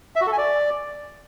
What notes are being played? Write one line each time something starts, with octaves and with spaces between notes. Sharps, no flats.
E5
F#4
A4
G#5
D5